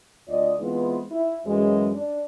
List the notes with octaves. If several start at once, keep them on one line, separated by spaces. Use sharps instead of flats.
D2 F4 D5 D#5
E3 G#3 B3 C4 E4 F4
E4
F#2 E3 F#3 G#3
D4